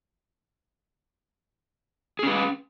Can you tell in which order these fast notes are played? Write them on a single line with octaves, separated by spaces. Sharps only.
G#4 C#4 B4